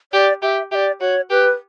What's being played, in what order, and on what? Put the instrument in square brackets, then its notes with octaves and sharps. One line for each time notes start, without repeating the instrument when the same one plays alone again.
[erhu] G4 [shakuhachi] D5
[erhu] G4 [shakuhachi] E5
[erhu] G4 [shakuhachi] D5 E5
[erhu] F#4 [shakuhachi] C#5
[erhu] G4 [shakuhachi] B4